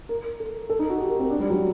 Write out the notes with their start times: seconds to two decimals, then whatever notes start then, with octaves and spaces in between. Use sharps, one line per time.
0.09 A#4
0.40 A4
0.70 A4
0.79 D#4
0.90 F#4
1.00 G4
1.09 A#4
1.19 C4
1.30 D4
1.40 G3
1.50 F#3